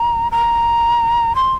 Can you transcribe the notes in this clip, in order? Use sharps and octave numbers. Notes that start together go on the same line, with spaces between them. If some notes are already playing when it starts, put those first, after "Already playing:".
Already playing: A#5
A#5
C6